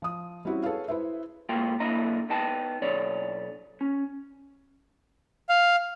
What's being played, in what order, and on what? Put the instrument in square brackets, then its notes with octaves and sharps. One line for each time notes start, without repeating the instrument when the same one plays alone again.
[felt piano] F3 D#6
G3 C4 C#4 E4 F#4
G#4 A4 B4 C#5 F5
E4 B4 C5 E5
[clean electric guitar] G#2 A#3 F4 F#4 G5
B1 A#3 D4 E4 D#5 A#5
B3 D#4 D#5 G5 A5
B1 D4 C#5 D5
C#4
[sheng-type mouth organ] F5